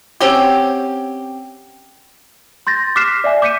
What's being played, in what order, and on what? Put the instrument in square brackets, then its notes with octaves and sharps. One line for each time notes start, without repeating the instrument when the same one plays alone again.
[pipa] C4 C#4 F#4 G4
[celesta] C6 G6 A6 A#6
D6 F6 F#6 B6 C7 E7
D5 E5 G#5
D6 G6 B6 C#7 D#7